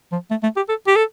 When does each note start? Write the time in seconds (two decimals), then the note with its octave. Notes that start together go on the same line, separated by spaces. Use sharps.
0.12 F3
0.30 A3
0.43 A3
0.56 G4
0.69 A4
0.87 G4
0.96 A4